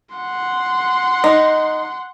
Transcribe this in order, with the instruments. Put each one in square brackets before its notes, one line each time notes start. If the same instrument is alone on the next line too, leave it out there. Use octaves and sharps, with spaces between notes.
[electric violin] F#5 C6
[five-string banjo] D#4